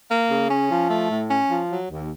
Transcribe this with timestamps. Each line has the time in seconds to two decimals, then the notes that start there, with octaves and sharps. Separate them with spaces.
0.08 A#3
0.29 C#3
0.49 C#4
0.69 F3
0.90 A3
1.10 A2
1.30 C#4
1.49 F3
1.70 F#3
1.91 D#2